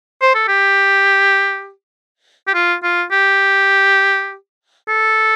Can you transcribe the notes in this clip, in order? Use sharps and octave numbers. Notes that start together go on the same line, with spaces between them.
C5
A4
G4
G4
F4
F4
G4
A4